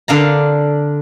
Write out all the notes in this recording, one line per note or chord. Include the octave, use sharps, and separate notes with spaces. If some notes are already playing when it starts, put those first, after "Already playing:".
D3 D4 F5 A#5